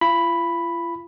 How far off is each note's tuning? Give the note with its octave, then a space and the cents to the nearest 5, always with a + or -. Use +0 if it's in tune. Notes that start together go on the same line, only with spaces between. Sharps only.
F4 -40 B5 +0